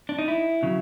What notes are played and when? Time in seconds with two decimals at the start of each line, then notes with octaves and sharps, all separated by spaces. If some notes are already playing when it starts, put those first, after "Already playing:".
0.09 D4
0.19 D#4
0.28 E4
0.63 C#3 F#3